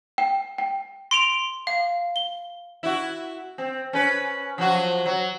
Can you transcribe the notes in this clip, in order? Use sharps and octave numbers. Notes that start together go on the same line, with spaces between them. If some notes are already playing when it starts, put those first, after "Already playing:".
G5
G5
C6 D7 F7
F5
G7
E4 F#4
C4
C#4 B4
F3 F#3 F#4
F#3